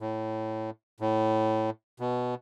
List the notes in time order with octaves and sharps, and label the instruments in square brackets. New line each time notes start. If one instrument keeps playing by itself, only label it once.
[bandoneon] A2
A2
B2